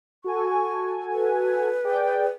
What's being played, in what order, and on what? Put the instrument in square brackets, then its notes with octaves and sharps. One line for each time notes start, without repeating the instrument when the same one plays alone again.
[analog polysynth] F#4 A4 G#5 [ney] C#6
[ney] B4
[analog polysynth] G#4 D5 G5